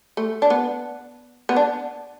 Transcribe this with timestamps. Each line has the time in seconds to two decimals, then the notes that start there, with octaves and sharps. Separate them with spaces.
0.17 A3
0.42 D4
0.50 B3
1.49 B3
1.56 D4